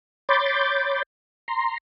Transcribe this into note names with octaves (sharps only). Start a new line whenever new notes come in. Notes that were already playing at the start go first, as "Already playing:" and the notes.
C#5 B5 C6 D6 G6 A6
A#5 C6